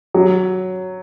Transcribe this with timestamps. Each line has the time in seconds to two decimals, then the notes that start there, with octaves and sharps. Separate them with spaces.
0.15 F#3